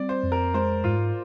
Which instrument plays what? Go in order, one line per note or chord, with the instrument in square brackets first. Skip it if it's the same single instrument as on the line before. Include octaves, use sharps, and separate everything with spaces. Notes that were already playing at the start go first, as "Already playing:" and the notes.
Already playing: [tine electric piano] G3 C4 [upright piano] D5
[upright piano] C5
[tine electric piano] F2
[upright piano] A#4
[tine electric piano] G#3 [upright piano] C5
[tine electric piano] G#2 [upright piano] F4